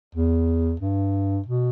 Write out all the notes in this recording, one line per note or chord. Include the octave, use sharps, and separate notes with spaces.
E2
G2
B2